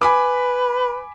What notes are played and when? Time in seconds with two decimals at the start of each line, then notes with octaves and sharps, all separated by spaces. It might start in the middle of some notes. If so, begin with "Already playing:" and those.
0.01 B4 G#5 B5 D6